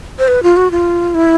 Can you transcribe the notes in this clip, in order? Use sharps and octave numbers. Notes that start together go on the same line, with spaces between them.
C5
B4
F4
F#4
F4
E4